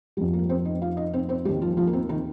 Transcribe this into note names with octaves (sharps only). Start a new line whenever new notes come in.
F2 F3 G3 G4
A#3 A#4
C4 C5
D#4 D#5
F4 F5
D#4 D#5
C4 C5
C4 C5
D#2 D#3 G3 G4
F3 F4
F3 F4
A#3
C4
D#3 D#4